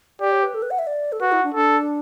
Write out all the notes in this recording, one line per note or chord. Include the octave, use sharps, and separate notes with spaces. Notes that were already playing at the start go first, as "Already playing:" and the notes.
G4 D5
C#5
B4
A4
B4
F#5
E5
D5
A4
F#4 B4
E4
D4
D4 A4